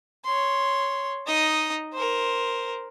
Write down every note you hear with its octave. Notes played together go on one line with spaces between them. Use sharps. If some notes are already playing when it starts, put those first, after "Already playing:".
C#5 C6
D#4 D#5
A#4 C5